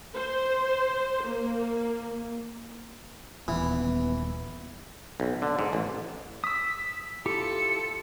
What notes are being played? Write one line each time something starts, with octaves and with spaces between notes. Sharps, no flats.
C5
A#3
D#1 E3 B3
B1
D3
G#2
A1
D#6 E6 B6
E4 F4 G4 A4 C#7